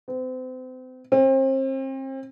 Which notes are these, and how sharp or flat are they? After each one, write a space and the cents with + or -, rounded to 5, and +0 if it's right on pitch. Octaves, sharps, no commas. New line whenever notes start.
C4 -35
C4 +35